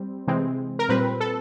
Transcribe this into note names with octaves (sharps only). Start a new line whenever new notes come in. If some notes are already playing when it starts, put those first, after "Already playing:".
Already playing: G3 C4
C3 E3 G#3 C4
A#4
A#2 G3 C4 B4
A4